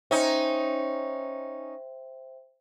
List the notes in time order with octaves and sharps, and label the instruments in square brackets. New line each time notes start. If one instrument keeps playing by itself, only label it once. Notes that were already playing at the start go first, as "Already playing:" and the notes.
[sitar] C#4 D#4 [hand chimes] C5 E5 G5